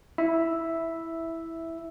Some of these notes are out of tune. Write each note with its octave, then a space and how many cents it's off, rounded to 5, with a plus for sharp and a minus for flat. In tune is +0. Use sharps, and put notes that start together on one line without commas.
E4 -5 E5 +0